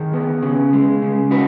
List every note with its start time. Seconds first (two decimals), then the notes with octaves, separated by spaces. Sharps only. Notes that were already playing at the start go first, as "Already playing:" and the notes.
Already playing: D#3 G#4
0.14 B3
0.43 C#3
0.73 G#3
1.02 C#3
1.30 D#4 F#4 B4